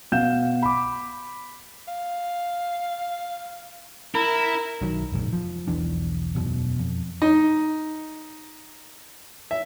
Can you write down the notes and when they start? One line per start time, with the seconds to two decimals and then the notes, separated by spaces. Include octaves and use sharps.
0.12 B2 F5 F#5 G6 E7
0.63 B5 D6
1.88 F5
4.15 E4 A#4
4.81 B1 D#3 F#3
5.12 F1 A#1 G#2
5.33 F3
5.68 E1 B1 E3 D4
6.35 E1 F#2 B2
6.79 F2
7.22 D#4
9.51 E5